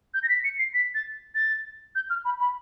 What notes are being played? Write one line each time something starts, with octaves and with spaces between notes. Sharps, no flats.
G6
A#6
B6
C#7
C7
B6
A6
A6
G6
F6
B5
B5